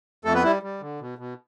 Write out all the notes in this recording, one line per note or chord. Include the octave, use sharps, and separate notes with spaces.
F2 A3 A4
B3 B4
G3 E4
G3
D3
B2
B2